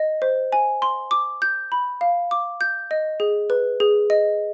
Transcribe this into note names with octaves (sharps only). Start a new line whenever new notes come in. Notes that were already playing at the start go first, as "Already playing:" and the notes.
Already playing: D#5
C5
G#5
C6
D6
G6
B5
F5
D6
G6
D#5
G#4
B4
G#4
D#5